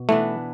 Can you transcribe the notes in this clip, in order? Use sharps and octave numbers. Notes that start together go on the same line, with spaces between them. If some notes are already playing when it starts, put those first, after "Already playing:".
Already playing: B2
E3 A3 B3 D4